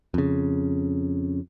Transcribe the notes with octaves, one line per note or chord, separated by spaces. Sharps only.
F2 C#3